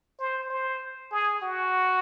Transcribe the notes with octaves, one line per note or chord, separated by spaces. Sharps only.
C5
C5
G#4
F#4